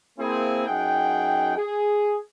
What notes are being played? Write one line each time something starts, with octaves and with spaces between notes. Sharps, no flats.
A#3 C4 E4 G#4
F#2 D#4 G#4 F#5 G5
G#4